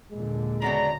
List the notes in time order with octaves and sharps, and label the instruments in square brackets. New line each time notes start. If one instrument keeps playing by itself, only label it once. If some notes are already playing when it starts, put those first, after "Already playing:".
[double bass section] D#2 A#2 D3 [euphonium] G#3
[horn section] F#2 A#5 [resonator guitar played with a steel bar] C#3 B3 D4